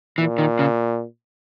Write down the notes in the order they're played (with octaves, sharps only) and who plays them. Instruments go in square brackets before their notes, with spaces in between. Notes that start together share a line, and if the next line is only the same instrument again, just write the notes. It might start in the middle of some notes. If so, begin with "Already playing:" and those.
[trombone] A#2 [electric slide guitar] E3
[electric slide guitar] D#3
C#3